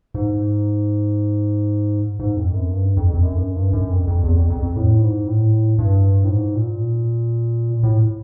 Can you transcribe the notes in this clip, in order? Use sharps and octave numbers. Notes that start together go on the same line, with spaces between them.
G#2
G#2
F2
F#2
G2
F2
F2
F#2
G2
F#2
G2
F#2
F2
F2
E2
F2
F2
F2
A2
G#2
A2
G2
A2
G#2
A#2
A2